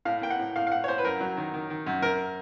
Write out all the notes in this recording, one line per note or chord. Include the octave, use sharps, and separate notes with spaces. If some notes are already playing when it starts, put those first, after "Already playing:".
A2 F5
A#3 G5
F#5
A2
A2 F5
F5
A2 F#5
C#5
A2 C5
B4
F#2 A#4
F#3
D#3
D#3
D#3
F#2
F#2 A#4